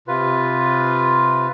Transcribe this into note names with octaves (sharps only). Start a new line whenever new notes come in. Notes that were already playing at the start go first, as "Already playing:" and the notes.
C3 F4 B4